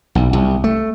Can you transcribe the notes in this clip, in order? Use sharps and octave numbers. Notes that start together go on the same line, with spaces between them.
B1
C2
A3